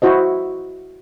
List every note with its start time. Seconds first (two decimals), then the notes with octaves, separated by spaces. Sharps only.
0.02 E4 F#4 C5 D#5